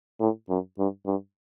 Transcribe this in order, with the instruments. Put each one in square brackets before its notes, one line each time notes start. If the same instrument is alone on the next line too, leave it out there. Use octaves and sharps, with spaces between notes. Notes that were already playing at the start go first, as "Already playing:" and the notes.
[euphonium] A2
F#2
G2
G2